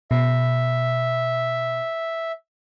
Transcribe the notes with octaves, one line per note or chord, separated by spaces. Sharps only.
B2 E5